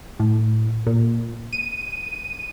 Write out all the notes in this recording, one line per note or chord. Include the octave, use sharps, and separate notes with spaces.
A2
A#2
D#7